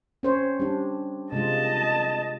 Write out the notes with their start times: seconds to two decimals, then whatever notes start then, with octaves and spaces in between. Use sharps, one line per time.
0.23 C#4 C5 C#5
0.60 G3 D4
1.32 C3 G#3 F4 D#5 A5